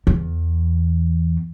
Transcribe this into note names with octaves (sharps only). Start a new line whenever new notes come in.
E2